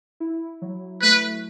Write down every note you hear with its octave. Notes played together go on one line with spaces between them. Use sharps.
E4
F#3
A3 B4